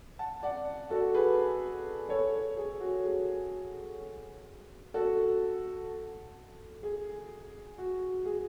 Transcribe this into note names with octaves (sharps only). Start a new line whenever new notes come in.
F#5 A5
D5 F#5
F#4 A4
G#4 B4
A4 C#5
G#4
F#4
G#4
F#4 A4
G#4
F#4
G#4